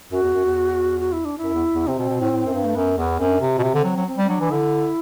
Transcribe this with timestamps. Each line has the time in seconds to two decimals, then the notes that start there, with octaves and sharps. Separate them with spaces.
0.12 F#2 F#4
0.23 E2
0.34 F#2
0.45 E2
1.00 F#4
1.12 E4
1.25 D4
1.38 E4
1.43 F#2
1.54 E2
1.74 E2
1.87 C3 C4
1.99 B2
2.09 B2
2.21 A2
2.31 A2
2.45 F#2
2.53 G2
2.64 A3
2.75 F#2 B3
2.97 E2 B3
3.19 F#2 C4
3.30 D4
3.41 C3 C4
3.58 B2
3.63 C3
3.74 D3
3.85 F#3
3.96 F#3
4.07 C4
4.18 G3
4.24 C4
4.29 F#3 D4
4.40 E3
4.51 D3 E4